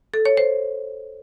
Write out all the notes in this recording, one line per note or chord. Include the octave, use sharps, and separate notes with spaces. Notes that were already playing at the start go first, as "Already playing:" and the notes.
A4
C#5
C5